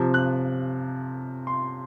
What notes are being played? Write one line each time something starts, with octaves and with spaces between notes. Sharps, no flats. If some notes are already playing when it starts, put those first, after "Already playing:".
Already playing: C3 F3
F#6
C6